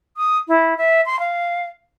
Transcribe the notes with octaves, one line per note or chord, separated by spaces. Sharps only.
D#6
E4
E5
C6
F5